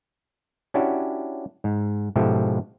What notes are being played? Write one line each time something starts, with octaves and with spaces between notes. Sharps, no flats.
C#4 D4 E4 F#4 G4
G#2
G#2 B2 F3 G4 A4 E5